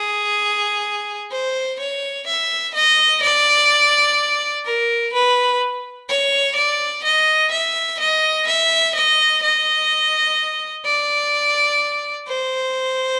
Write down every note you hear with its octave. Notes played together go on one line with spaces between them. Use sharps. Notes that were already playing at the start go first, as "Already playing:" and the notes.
Already playing: G#4
C5
C#5
E5
D#5
D5
A#4
B4
C#5
D5
D#5
E5
D#5
E5
D#5
D#5
D5
C5